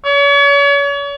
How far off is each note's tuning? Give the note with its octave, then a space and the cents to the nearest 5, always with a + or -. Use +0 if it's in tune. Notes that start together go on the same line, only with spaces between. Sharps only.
C#5 +40